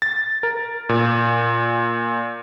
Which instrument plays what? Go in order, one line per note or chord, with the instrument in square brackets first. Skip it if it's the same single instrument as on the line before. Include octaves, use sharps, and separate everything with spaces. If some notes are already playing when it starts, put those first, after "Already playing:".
[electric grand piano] A6
A#4
A#2